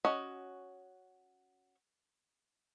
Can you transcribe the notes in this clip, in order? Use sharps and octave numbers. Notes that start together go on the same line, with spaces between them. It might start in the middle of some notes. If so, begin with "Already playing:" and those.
C#4 F#4 D#5